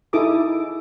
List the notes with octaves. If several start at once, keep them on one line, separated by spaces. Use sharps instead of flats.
D#4 E4 G#4 A4 D6 D#6